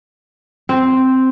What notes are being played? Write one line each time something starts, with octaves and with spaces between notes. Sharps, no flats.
C4